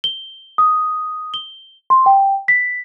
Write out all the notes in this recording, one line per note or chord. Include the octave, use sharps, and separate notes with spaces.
G7
D#6
G7
C6
G5
B6